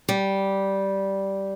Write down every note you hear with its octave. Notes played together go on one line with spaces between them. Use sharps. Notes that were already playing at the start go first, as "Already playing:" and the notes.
G3